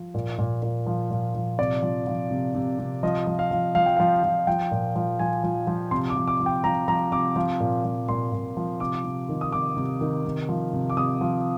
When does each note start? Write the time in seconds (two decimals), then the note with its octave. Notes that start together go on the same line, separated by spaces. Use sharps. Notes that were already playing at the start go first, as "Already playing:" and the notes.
Already playing: F3
0.14 A#2
0.38 A#2
0.63 A#2
0.87 F3
1.11 A#2
1.35 F3
1.59 C3 D5
1.82 F3
2.07 F3
2.31 C3
2.55 C3
2.79 C3
3.03 F3 D#5
3.27 F3
3.39 F5
3.51 F3
3.75 F3 F5
3.86 G5
3.97 F3 F5
4.23 F3
4.47 F3 G5
4.71 A#2
4.96 F3
5.19 F3 G#5
5.43 F3
5.67 F3
5.91 C3 C6
6.09 D6
6.16 F3
6.28 D6
6.40 F3
6.46 G5
6.64 F3 A#5
6.88 F3 A#5
7.12 C3 D6
7.36 F3
7.60 A#2
7.84 F3
8.09 A#2 C6
8.32 A#2
8.57 F3
8.80 C3 D6
9.04 C3
9.29 D#3
9.41 D#6
9.52 C3 D6
9.76 C3
10.01 D#3
10.25 C3
10.49 F3
10.73 C3
10.90 D6
10.97 C3 D#6
11.21 F3